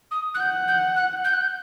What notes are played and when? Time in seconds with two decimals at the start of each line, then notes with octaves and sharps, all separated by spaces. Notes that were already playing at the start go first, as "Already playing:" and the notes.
0.11 D#6
0.34 F#6
0.40 F#5 G6
0.68 G6
0.96 F#6
1.24 G6
1.33 F#6
1.41 G6